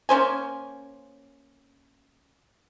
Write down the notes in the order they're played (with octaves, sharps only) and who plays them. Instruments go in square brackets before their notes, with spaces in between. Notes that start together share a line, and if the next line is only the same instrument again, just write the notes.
[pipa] A#3 C#4 C5 G#5